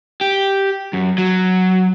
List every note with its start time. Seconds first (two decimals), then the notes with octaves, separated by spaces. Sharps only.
0.21 G4
0.93 F#2
1.18 F#3